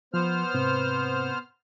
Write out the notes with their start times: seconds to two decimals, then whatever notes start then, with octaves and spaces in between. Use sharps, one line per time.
0.14 F3 B3 C5 F6
0.54 G#2 C3 C4